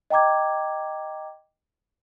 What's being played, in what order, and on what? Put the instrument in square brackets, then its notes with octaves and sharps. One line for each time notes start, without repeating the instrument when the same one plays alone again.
[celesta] D#5 G5 A#5 D6 G#6